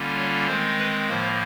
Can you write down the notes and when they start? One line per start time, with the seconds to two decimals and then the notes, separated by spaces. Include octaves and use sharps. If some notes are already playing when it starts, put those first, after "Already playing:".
Already playing: D3 G3 A#3 C#4 F4
0.16 C#5
0.47 D#3 G#3 C4 C5
0.78 B4
1.09 A2 F3 A#3 C5